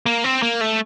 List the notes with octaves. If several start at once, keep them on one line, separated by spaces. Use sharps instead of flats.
A#3
C4
A#3
A3